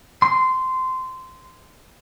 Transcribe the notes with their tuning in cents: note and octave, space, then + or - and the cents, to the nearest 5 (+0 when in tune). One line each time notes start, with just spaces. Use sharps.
C6 -15